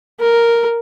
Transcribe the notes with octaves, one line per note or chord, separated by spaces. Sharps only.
A#4